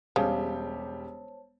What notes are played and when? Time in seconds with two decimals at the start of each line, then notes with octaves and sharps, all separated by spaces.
0.16 E1 C#3 G3 G4 C5 C#5 A5